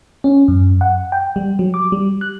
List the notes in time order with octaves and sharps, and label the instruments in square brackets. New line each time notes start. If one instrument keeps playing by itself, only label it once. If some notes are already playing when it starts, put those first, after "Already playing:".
[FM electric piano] C#4
F#2
F#5
G5
G3
F#3
D6
G3
F#6